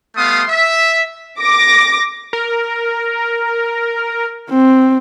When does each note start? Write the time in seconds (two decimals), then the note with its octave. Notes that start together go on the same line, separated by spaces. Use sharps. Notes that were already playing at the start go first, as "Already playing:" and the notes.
0.16 G3 A3 B3 F5 C6 D#6
0.48 E5
1.40 D6 A#6
2.33 A#4
4.50 C4